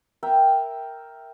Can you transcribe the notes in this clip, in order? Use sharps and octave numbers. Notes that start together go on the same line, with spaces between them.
A#4 E5 G5